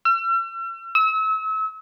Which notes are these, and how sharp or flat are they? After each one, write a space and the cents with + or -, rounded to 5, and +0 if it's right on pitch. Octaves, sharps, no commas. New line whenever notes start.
E6 +45
E6 -35